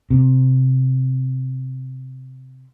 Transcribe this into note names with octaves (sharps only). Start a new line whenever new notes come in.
C3 C4